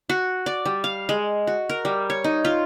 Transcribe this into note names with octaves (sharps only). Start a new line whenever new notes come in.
F#4
D5
G3
F5
G#3
F#4
A#4
G3
C#5
D#4
F4